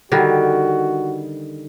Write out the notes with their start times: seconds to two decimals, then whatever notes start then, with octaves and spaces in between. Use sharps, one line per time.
0.12 D3 D#3 G3 F#4